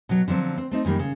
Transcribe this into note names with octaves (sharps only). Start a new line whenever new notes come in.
B2 F#3
D3 F3 F#3 C4
C4
A3 C4 D#4
F#2 D#3 G3 A#3
C#3